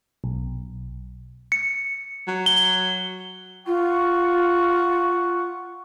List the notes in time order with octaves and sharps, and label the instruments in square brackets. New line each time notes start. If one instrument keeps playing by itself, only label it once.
[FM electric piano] B1
[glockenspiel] C#7
[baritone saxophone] F#3
[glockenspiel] G7
[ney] F4 [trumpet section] F#5 C#6